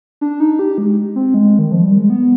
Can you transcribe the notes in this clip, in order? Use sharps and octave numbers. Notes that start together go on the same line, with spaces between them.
D4
D#4
G4
G#3
C4
G#3
D#3
F3
G3
G#3
B3